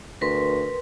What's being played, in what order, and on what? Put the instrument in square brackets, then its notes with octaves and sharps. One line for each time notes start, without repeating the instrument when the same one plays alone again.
[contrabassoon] D2 [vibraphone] A#4 B4 C6